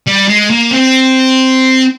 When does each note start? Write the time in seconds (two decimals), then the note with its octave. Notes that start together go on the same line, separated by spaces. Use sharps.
0.07 G3
0.28 G#3
0.50 A#3
0.71 C4